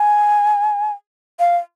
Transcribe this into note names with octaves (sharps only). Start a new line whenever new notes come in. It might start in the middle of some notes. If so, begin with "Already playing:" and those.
Already playing: G#5
F5